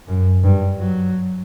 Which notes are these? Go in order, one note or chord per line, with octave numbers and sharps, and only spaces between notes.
F#2
G2
F#3